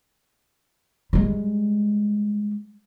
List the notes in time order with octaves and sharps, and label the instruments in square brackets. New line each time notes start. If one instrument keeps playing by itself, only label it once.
[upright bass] G3 G#3